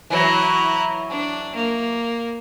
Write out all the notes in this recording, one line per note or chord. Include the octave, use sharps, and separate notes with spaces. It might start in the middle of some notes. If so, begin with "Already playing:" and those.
E3 F#3 E4 A#5
D4
A#3